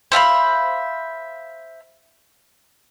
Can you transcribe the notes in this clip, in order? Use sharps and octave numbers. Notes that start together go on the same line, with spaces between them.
C5 E5 F5 B5